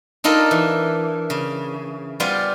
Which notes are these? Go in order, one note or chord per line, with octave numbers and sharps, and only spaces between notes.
D4 D#4 F4 A4 A#4
E3
C#3
G3 B3 F4 C5 D5 G#5